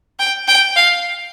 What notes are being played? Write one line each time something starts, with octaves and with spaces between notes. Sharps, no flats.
G5
G5
F5